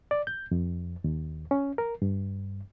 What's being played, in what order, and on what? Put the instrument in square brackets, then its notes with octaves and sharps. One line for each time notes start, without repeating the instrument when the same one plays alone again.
[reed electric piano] D5
G6
F2
D#2
C#4
A#4
G2